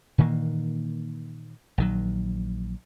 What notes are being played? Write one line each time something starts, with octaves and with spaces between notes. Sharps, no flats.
A#2 D#3 E3 A#3
A#1 D#3 F#3